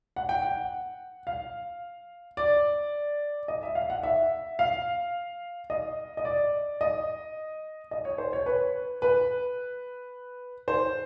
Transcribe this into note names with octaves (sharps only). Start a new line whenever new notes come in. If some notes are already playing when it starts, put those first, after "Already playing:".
F#5
G5
F#5
F5
D5
D#5
E5
F5
F#5
E5
F5
D#5
D#5
D5
D#5
D#5
C#5
C5
C#5
B4
B4
C5